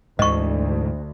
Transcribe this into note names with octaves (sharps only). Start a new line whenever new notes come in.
D2 G#2 E3 D#5 C#6